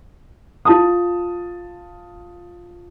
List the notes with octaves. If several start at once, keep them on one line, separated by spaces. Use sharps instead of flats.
F4 A5 D#6